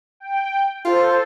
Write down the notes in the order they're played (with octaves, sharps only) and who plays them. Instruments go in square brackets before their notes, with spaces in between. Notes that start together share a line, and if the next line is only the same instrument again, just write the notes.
[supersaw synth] G5
[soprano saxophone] F4 [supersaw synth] A4 C5